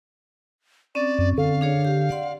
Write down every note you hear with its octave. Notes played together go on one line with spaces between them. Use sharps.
C4 C#4 D5
F#2
D3 F5
D4 G#4 C#5
G4
D5 F#5 C6